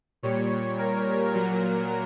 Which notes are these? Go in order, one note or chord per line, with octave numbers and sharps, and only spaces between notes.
A#2 G3 C#5
A#4
A#2 F#3 A#4